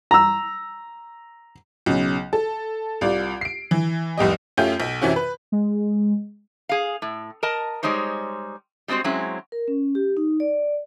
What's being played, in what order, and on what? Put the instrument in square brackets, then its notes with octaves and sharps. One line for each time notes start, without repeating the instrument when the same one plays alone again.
[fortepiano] A#5 E6
[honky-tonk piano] B1 C#3
A4
C2 F4 D5
C7 D7
E3
F1 C2 G4 D#5
F#2 A3 C#4 F4 G4 G6
B1
F#2 C3 E3 C#4 F#4
B4
[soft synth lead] G#3
[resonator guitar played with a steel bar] G#4 F5
A2
A#4 D#5 A5
G3 G#3 D#4 C5 C#5
G3 G#3 C4 F#4 C5
F#3 G#3 C4 C#4 E4
[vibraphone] A#4
C#4
G4
D#4
D5